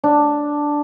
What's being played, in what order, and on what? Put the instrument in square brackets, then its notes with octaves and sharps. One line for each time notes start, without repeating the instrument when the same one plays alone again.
[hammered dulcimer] D4